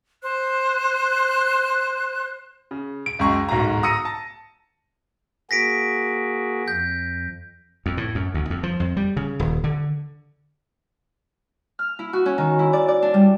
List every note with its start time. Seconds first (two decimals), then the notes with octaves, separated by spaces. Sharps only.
0.23 C5 F#6
2.71 C#3
3.06 D7
3.19 C#2 F#2 G#3 A#5 C#6
3.49 D1 B1 G#2 F#4 A#5
3.83 A#5 D#6 E6 A#6 C#7 D#7
4.05 A5
5.51 A#3 F#4 G#4 A#6 B6 D7
6.68 F2 G6
7.86 F2
7.97 A2
8.15 F#2
8.34 D2
8.50 F2
8.63 F3
8.80 F2
8.97 G3
9.17 C#3
9.39 D#1
9.64 D3
11.79 F6
11.99 E4
12.13 F#4
12.26 C#4
12.38 D#3
12.59 E4
12.73 D5
12.88 D5
13.02 D4
13.14 G3